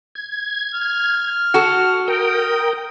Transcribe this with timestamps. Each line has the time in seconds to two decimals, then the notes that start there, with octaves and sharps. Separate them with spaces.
0.15 G#6
0.75 F6
1.54 F#4 A4
2.08 A#4 G5 D#6